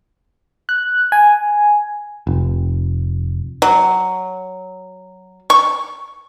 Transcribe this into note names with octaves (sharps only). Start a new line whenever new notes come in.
F#6
G#5
F1
F#3
C#6